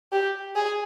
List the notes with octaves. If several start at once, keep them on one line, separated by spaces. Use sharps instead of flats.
G4
G#4